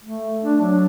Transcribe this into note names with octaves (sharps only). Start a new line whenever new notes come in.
A3
D4
F#3